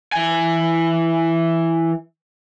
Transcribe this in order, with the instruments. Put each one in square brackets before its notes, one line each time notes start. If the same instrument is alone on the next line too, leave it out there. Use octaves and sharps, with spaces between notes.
[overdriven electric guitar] E3 G#5